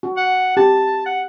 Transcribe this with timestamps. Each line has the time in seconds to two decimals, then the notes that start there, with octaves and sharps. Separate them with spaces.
0.03 F#4
0.17 F#5
0.57 G4 A5
1.06 F#5